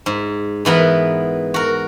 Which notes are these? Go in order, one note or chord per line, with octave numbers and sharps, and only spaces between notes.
G#2
G#2 E3 B3 A#4
F#4 A#4